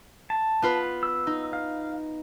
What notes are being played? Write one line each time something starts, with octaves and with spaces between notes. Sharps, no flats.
A5
B3 F4 B4
E6
D#4
F5